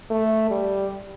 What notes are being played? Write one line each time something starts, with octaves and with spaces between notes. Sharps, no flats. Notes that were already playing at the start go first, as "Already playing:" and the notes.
A3
G3